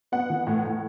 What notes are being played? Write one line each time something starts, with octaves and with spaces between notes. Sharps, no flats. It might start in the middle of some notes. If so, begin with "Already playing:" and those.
B3 F#5
E3
A2
A2